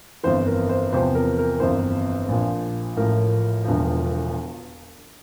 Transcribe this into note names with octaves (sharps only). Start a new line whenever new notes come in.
G1 F2 E3 C5
A#4
C5
E2 C3 F3 C5
A#4
A#4
G1 F2 E3 C5
A#1 A#2 F3
A1 A2 F3 A#4
E1 E2 D3 F3